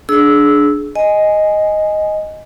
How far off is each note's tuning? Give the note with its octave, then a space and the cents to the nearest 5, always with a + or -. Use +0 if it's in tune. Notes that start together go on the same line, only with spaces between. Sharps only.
D4 +0 G#4 +25 E6 -10
D#5 +0 G#5 +0